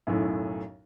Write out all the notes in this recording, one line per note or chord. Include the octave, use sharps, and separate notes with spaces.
B1 F#2 A2